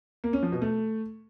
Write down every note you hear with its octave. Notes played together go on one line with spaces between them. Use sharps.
A#3
C#4
F3
B2
A3